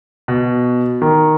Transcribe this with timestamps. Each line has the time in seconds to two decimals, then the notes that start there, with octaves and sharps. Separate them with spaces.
0.28 B2
1.02 D#3